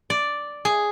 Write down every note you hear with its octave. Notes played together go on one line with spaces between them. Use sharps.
D5
G#4